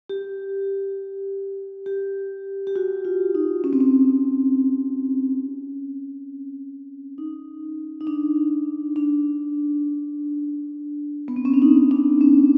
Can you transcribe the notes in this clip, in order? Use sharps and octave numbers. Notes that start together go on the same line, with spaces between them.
G4
G4
G4
F#4
F4
D#4
C#4
C4
C#4
D#4
D#4
D4
D4
B3
C4
C#4
D4
D#4
D4
C#4